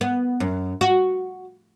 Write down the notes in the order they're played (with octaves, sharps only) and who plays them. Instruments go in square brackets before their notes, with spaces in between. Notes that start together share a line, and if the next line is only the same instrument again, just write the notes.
[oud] B3
F#2
F#4